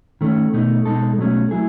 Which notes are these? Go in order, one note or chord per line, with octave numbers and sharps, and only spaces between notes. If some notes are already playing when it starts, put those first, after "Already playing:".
D#3 A3 C#4
B2 A3 D#4
B2 G#3 D#4 A4
B2 F#3 A3 C#4
F#3 A3 E4 G#4